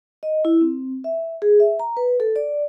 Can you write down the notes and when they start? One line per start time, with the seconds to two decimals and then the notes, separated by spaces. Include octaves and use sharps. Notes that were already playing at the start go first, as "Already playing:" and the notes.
0.23 D#5
0.45 E4
0.61 C4
1.04 E5
1.42 G#4
1.60 E5
1.80 A#5
1.97 B4
2.20 A4
2.36 D5